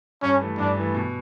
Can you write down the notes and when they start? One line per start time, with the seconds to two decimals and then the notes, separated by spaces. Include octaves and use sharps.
0.22 G2 C#4
0.41 E3 A3
0.58 G2 D4
0.77 E3 A3
0.94 B2